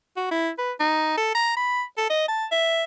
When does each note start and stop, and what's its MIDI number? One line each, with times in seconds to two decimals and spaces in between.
0.17 0.29 66
0.31 0.50 64
0.58 0.72 71
0.80 1.15 63
1.17 1.30 69
1.35 1.55 82
1.57 1.83 83
1.97 2.09 69
2.10 2.26 75
2.28 2.46 81
2.52 2.84 76